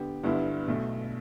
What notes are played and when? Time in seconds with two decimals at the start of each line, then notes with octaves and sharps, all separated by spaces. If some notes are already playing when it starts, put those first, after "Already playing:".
Already playing: D3 B3 G4
0.23 G1 G2 D3 B3 E4
0.68 B1 B2 A3